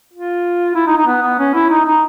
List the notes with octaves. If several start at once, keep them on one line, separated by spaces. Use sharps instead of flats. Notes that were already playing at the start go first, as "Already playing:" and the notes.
F4
E4
D#4
D#4
B3
B3
C#4
E4
D#4
D#4